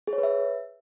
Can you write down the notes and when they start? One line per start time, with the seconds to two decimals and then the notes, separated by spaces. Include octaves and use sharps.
0.07 G#4
0.13 C#5
0.18 B4
0.23 E5